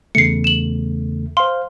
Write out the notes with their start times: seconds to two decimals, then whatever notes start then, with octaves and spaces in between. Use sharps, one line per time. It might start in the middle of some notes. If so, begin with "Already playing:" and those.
0.15 E2 C#3 A3 C7 C#7
0.44 E7 F#7
1.37 C5 F5 C6